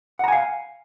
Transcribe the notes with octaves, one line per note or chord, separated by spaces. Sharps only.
F5 F#5 G#5 A#5